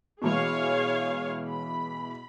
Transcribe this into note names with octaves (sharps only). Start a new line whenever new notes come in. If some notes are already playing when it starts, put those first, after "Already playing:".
B2 E3 G#3 G#4 C#5 F5
B5